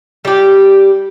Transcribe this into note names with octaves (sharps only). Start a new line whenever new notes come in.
G3 G4